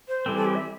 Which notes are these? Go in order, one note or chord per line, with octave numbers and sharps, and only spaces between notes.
C5
E3 G3 C4 A4
A4
G4
E5